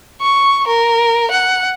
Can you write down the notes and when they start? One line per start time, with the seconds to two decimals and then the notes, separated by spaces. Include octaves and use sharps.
0.22 C#6
0.68 A#4
1.31 F#5